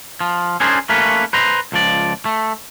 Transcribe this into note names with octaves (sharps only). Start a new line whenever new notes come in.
F3
C#4 D4 G#4 A#4 C5
A3 A#3 C#4 A#4 B4
B4 C5 A#5
C#2 F3 D5
A3